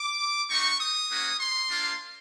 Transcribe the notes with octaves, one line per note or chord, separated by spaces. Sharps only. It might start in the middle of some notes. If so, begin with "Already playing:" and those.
Already playing: D6
G3 C4 D#4 F#4 C#6
D#6
A#3 C#4 F#4
C6
A#3 D4 F4